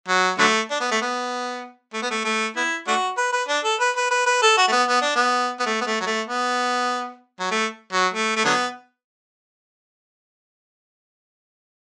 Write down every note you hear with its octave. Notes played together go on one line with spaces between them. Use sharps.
F#3
D3 F#3 A3
D4
B3
A3
B3
A3
B3
A3
A3
B3 E4
A3 D4 F#4
B4
B4
D4
A4
B4
B4
B4
B4
A4
F#4
A3
B3
B3
D4
B3
B3
A3
B3
A3
F#3
A3
B3
F#3
A3
F#3
A3
A3
D3 F#3 B3